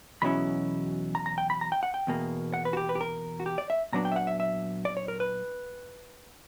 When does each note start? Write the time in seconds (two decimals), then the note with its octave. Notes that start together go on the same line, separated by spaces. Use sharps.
0.22 E2 B2 F#3 C#4 E4 B5
1.15 A#5
1.26 A#5
1.38 G5
1.50 B5
1.61 A#5
1.72 G5
1.83 F#5
1.94 G5
2.07 E2 B2 A#3
2.54 F#5
2.65 B4
2.73 F#4
2.77 G4
2.89 B4
2.95 G4
3.01 A#4
3.40 F#4
3.46 G4
3.58 D5
3.70 E5
3.93 A#2 F#3 B3 D4 A#5
4.05 G5
4.12 E5
4.16 F#5
4.27 E5
4.40 E5
4.85 D5
4.97 C#5
5.08 A#4
5.20 B4